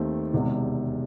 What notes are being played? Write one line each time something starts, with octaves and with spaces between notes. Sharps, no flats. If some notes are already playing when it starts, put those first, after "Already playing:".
Already playing: D#2 D#3 A3 C4
E1 E2 C3 D#3